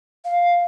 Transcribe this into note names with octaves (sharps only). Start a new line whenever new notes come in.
F5